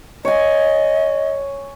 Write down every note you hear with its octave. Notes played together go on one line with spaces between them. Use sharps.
C#5 D#5 G#5